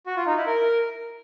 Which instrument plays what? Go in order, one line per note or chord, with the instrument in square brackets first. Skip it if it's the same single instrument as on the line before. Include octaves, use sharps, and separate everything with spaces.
[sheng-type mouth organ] F#4
F4
D#4
E4
A#4